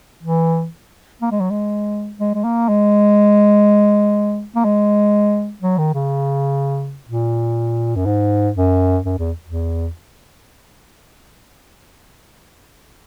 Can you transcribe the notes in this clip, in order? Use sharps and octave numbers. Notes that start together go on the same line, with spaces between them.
E3
A#3
G#3
F#3
G#3
G#3
G#3
A#3
G#3
A#3
G#3
F#3
D#3
C#3
A#2
F#2
G#2
F#2
F#2
E2
E2